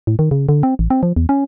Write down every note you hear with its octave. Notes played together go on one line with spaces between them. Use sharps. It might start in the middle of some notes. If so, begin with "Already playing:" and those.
A2
D#3
C#3
D3
C4
A1
C4
F3
E2
C#4